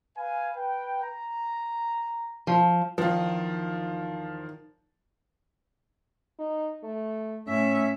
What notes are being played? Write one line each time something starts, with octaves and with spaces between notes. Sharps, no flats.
B4 F5 G#5
B4 G5
A#5
F3
E2 D#3 F3 F4
D#4
A3
A2 C#4 E5